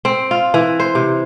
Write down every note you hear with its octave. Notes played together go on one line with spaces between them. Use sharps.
C4
F4
E3
C5
C3